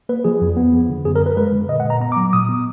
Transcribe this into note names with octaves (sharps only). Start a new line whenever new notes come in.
A#3 B4
F3 G#4
F2
B3
F3
D3
F#2 G#4
A#4
F#2 B4
G#3 B4
D3
A#2 D#5
F#5
A#2
A#5
B3 A#5
D6
F#3
A#2 D#6
B3